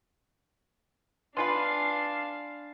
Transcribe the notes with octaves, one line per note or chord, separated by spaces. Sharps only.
B3 D4 F4 B4 F5 G#5 C6